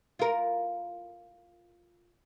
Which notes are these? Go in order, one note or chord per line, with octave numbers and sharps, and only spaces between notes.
F4 A#4